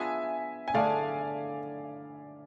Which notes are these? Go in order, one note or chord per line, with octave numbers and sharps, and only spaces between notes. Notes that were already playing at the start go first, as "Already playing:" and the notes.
Already playing: B3 D4 F4 G#4 E5 G#5
G#5
D3 A3 D4 G#4 D5 F5